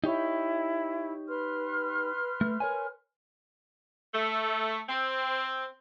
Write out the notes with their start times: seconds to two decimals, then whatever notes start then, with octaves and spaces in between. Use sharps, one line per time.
0.04 D#4 E4 G4 C#5
1.29 B4 C6 F6
2.41 A3
2.60 A#4 C#5 G#5
4.13 A3
4.88 C4